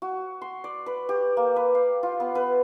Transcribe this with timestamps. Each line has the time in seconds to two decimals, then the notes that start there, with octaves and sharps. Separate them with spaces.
0.02 F#4
0.42 C6
0.64 D5
0.86 B4
1.09 G4
1.37 A#3
1.56 B4
1.75 F5
2.03 F4
2.20 B3
2.35 B4